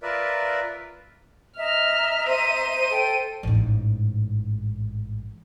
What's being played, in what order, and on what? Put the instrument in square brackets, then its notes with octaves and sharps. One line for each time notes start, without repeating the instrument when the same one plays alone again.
[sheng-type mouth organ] F4 A#4 B4 D5 E5
[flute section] D#5 E5 A#5 [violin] F6
[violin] C5 D#7
[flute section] A4 G5
[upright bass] A1 G#2